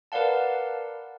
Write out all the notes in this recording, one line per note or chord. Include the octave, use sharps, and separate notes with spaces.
A#4 B4 D5 F5 F#5 A5